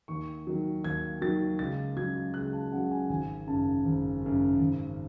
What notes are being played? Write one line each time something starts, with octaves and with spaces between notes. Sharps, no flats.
D#2 C#6
D#3 F#3
D#2 G#6
D#3 F#3 A6
C#2 A6
C#3 F#3 G#6
C#2 F#6
A5
C#3 F#3 F#5
G#5
G#1 G#5
F#2 C#3 A5
G#1
F#2 C#3
G#1